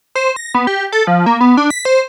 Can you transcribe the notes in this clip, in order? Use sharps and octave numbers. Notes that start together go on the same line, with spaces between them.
C5
A#6
B3
G4
A4
F3
A#3
B3
D4
B6
C5